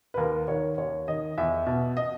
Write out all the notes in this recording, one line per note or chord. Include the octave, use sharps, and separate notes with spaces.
B4
D#2 A#4
D#3 C#5
D#2 C#5
D#3 D#5
E2 E5
B2
D#5